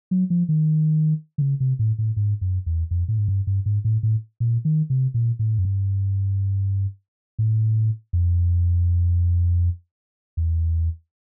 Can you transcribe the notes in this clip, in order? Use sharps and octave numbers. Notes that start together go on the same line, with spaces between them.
F#3
F3
D#3
D3
C#3
C3
A2
A2
G#2
F#2
E2
F2
A2
G#2
G2
G2
G#2
A2
A2
A#2
D#3
C3
A#2
A2
F#2
G2
A2
F2
E2